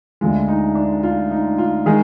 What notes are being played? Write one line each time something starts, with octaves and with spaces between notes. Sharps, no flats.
D2 D3 G#3 F4
D#4
D4
F4
D#4
F4
D#3 G#3 G#4